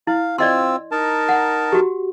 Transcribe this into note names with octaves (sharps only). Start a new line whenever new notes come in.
E4 F5
C4 F4 D5 D#5 C6 E6
D#4 A#4 A5
F#5
F#4 G4